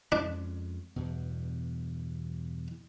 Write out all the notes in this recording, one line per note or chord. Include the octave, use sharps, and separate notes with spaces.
F2 G#3 C#4 D4
E2 G2 B2